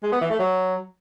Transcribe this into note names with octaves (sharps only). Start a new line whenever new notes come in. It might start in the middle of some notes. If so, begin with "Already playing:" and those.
G#3
B3
E3
A3
F#3